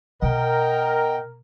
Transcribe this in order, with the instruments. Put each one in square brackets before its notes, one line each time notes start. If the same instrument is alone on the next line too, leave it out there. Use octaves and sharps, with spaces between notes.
[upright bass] B2 [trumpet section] A#4 [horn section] D#5 F#5 G5